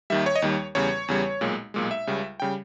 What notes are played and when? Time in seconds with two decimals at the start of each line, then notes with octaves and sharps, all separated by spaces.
0.10 D#2 D#3 G3 E5
0.26 C#5
0.36 D#5
0.42 D#2 D#3 G3 C#5
0.75 E2 C#3 G3 C#5
1.08 E2 C#3 G3
1.41 B1 A#2 G#3
1.74 B1 A#2 G#3
1.91 E5
2.07 C#2 C#3 G3
2.40 C#3 G3 G5